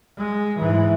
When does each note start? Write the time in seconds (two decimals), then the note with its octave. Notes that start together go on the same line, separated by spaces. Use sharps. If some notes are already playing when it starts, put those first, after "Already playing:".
0.18 G#3
0.60 G#2 E3